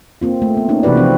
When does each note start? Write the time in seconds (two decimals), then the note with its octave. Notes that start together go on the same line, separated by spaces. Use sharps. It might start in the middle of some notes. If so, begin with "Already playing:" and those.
0.22 A#3 C4 F4
0.42 A3
0.57 B3
0.68 A#3 C#4 D#4
0.83 C3 E3 F#4 G4 B4 D5
0.96 F3 C4 F4